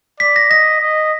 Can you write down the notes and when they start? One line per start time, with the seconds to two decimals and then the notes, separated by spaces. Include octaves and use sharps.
0.20 D5 B6
0.36 A#6
0.50 D#5 A#6
0.81 D#5